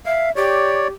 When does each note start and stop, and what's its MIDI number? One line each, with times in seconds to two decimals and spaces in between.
0.06 0.31 76
0.06 0.30 77
0.36 0.92 67
0.36 0.88 73
0.36 0.88 74